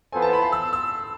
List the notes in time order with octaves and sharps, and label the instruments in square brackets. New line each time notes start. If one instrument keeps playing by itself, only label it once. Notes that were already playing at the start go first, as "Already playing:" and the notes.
[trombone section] E3 B3 F4 A4 C5 [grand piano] G#5
[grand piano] A5
B5
C6
E6
E6